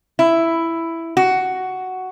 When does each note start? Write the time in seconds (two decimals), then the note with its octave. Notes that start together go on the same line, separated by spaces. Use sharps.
0.19 E4
1.17 F#4